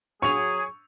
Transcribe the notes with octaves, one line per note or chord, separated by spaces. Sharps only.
F#3 G#4 C#6 F7